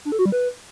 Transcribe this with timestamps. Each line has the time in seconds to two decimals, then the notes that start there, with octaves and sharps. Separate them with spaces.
0.05 D4
0.12 A4
0.19 F#4
0.26 G3
0.32 B4